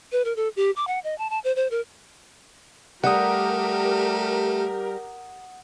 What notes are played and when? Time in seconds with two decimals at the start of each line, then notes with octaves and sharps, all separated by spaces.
0.12 B4
0.25 A#4
0.36 A4
0.56 G4
0.76 D6
0.87 F#5
1.04 D#5
1.18 A5
1.30 A5
1.44 C5
1.56 C5
1.71 A#4
3.04 G3 A3 G4 A#4 F#5 D#6